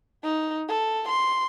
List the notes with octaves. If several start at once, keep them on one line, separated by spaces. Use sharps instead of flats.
D#4
A4
C6